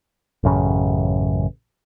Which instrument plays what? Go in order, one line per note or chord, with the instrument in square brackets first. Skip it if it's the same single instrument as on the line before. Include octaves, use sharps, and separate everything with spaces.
[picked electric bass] A1 F#2 C#3